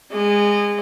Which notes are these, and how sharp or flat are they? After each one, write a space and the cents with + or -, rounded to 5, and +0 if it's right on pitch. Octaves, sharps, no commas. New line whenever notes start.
G#3 -20 D#5 -30